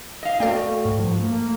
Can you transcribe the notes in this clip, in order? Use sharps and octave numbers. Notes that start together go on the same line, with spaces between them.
D#5 F5
A3 F#4 A4 D5 G5
G#2
G2 F3
A3 A#3